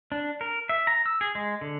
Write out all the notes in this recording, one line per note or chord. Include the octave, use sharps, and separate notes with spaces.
D4
A#4
E5
A#5
E6
G#4
G#3
D3